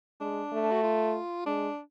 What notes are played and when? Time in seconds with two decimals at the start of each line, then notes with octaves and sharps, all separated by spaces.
0.21 G#3 D4
0.52 A3
0.71 F#4
0.83 F4
1.46 G#3 D4